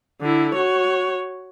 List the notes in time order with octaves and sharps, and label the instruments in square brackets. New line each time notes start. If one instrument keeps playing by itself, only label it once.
[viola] D3 E4
F#4 C#5